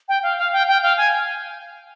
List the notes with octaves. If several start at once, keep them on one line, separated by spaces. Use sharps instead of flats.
G5
F5
F5
G5
G5
F5
G#5